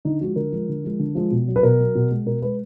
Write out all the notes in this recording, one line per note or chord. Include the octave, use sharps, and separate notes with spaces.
D3 D#4
F3 G#3 F#4
D3 A#4
F3 G#3
D3
F3 G#3
D3
F3 G#3
B2
F#3
B4
B2 A#4
F#3
B2
G#3
B2 A#4
G#3 B4